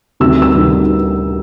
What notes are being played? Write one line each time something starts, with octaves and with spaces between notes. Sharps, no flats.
D2 C3 D#3 G3 E6
E6
D2 C3 D#3 G3